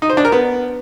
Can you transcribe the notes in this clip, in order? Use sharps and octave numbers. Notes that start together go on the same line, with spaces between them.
D#4
C5
D4
A#4
B3